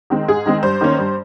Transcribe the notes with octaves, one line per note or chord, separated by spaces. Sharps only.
D#3 G#3 C4
G#2 G#4
D#3 G#3 C4
G2 C5
D#3 A#3 C#4
G2